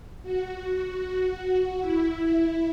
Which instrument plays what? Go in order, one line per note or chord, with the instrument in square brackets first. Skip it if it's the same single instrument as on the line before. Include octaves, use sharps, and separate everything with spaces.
[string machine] F#4
F#4
F#4
E4